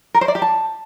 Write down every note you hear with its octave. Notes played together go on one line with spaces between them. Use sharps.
A#4
C5
D5
G4
A5